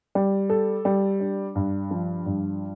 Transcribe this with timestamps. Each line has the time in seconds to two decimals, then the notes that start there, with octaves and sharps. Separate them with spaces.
0.15 G3
0.50 A4
0.85 G3
1.20 D4
1.55 G2
1.91 F3
2.26 G2